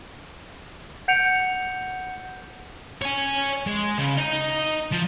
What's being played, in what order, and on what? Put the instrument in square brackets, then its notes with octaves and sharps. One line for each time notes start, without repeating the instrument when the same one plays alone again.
[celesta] F#5 G6 C#7 D7 F7
[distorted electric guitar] C#5 G#5
G#3
C#3
D#4 D#5
F3